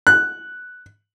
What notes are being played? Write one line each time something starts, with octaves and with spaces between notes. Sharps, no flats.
F#6